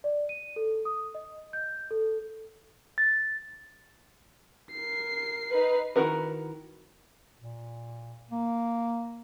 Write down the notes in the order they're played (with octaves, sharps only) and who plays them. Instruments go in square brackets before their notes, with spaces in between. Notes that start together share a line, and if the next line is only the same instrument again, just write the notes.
[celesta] D5
D#7
A4
D#6
D#5
G6
A4
[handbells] A6
[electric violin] A#4 C7
[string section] D#4 B4
[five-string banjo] D#3 E4 F#4 A#4 B4
[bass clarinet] A#2
A#3